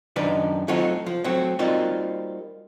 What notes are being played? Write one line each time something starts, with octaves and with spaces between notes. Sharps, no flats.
F#2 D#3 D4 D#4 B4 D5
F#3 A3 C4 D#4 F4 F#4
F3
F#3 A3 C4 F#4
G3 A#3 C4 D#4 F4 F#4